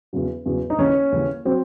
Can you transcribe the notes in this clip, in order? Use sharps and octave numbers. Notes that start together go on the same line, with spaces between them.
E2 C#3 F#3
E2 C#3 F#3
D#4
D#2 C#3 E3 C#4
D#2 C#3 E3
F#3 C4